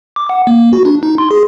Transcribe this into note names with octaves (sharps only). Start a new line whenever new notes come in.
D6
F#5
A#3
F#4
D4
D#4
C6
G#4